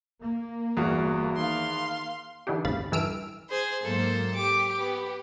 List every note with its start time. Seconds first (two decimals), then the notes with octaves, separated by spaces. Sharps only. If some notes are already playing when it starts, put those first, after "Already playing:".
0.21 A#3
0.77 G1 E2 F#4 F5
1.37 D#3 F5 C6
2.47 D3 E3 D4 D#4 G4
2.64 G#1 D#2 C#3 F5 B5 A6
2.92 G2 E3 A4 E6 F6 D7
3.49 G#4 C5
3.83 G#2 F#3 A#3 A4 C5
4.34 G4 D6
4.78 B3